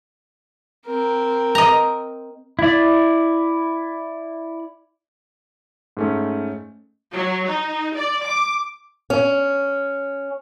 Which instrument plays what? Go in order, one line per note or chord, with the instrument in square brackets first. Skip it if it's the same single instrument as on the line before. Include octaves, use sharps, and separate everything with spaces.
[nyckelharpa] C4 A#4
[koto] D#5 A#5
[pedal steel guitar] E4 D5
[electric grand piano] G#2 A3 C#4
[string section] F#3
D#4
D5
D6
[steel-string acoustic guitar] C#4